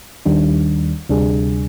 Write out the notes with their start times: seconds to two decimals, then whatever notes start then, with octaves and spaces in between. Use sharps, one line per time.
0.26 D#2 D#3 G3 D4
1.09 D2 C3 G3 D4 G#4